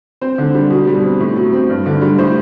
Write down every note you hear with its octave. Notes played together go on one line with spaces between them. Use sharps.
C4 C5
D3
G3
B2
G3
C4
A2
F#3
C4
G2
D3
G3
A2 C5